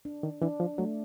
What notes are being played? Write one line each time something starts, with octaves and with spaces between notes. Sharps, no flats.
D4
D#3
E3 D4
F3
F#3 A3